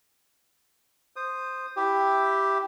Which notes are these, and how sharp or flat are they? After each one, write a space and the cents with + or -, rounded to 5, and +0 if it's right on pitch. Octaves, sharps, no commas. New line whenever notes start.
C5 +0 D#6 -10
E4 +0 G4 +0 E5 +0